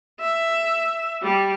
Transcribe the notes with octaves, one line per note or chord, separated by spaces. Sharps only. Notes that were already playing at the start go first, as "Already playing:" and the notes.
E5
G3